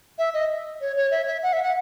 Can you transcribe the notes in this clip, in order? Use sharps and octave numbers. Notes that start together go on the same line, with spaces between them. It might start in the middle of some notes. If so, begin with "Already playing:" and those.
E5
D#5
C#5
C#5
E5
E5
F#5
E5
F#5